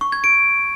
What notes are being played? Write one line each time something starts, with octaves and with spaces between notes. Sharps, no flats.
C#6
G#6
D7